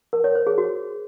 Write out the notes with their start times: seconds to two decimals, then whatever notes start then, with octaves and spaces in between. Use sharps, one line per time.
0.13 A#4
0.24 C#5
0.35 C5
0.47 G#4
0.58 F#4